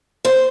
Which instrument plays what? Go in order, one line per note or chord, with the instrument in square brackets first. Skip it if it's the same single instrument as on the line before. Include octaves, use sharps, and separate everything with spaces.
[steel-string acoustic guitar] C5